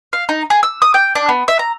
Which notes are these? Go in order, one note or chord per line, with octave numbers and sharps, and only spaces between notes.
F5
D#4
G#4
E6
D#6
G5
D4
B3
E5
A#5